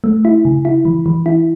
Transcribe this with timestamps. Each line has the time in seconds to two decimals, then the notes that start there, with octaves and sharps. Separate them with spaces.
0.04 A3
0.25 E4
0.45 C#3
0.65 E4
0.85 E3
1.06 E3
1.26 E4